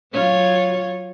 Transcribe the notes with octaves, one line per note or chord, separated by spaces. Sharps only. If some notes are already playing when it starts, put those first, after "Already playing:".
F#3 F4 C#5